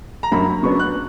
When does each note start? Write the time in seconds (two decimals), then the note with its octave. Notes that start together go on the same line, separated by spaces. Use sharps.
0.23 A#5
0.31 F#2 D3 F#3 A#3 B5
0.63 C#3 F#3 B3 D4 C#6
0.80 F#6